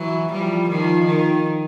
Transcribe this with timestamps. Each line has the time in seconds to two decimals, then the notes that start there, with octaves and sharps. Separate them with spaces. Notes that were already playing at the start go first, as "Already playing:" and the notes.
Already playing: E3 F#3
0.32 F3 G3
0.69 D#3 F3
1.06 D#3